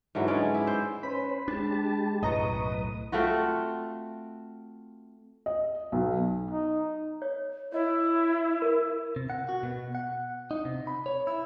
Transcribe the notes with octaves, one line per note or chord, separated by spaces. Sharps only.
G#2 D3 E3 F#3
G#3 C#4 D5
E4
C5
C#4 B4 C5 B5
G#3 D4 G4 A5
B1 F#2 A2 B4 D#5 A#5 C#6 D#6
A3 C4 F4 F#4
D#5
B1
D#4
C#5
E4 C#5 D#5
A#4
C3
F#5
F#4
B2
F#5
D#4
C3
B5
C#5
E4